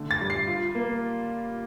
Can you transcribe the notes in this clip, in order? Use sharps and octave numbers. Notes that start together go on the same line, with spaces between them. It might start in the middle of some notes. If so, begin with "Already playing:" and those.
Already playing: D3 A3
A6
G3
C7
F4
A#3